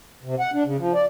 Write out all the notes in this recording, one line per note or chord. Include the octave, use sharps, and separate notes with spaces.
C3
F#5
D4
C#3
F3
D5